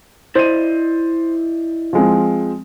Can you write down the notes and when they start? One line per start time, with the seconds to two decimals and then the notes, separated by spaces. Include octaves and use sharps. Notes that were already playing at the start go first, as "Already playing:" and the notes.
0.35 E4 C5 D5 D#5 D#7
1.93 F3 G#3 C4